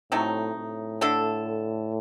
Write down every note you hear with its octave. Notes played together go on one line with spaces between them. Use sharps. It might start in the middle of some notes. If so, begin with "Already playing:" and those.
A2 C3 F#3 A3 D#4
A2
D3 A3 D4 A4